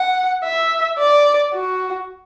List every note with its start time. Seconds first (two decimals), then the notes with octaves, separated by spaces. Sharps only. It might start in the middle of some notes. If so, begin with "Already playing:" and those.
Already playing: F#5
0.44 E5
0.99 D5
1.54 F#4